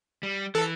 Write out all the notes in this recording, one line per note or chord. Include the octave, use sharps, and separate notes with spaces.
G3
E3 A4